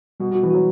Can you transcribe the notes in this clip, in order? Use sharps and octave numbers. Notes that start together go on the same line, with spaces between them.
B2 G3
B2 F#4
E3
F#3 F#4